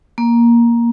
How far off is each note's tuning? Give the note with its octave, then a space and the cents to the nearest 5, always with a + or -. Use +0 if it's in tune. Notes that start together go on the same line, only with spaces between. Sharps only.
A#3 +10